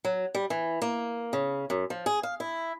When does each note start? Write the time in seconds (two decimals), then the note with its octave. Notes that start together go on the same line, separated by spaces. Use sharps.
0.05 F#3
0.35 G3
0.50 E3
0.82 A#3
1.33 C#3
1.70 F#2
1.90 F3
2.06 G#4
2.23 F5
2.40 E4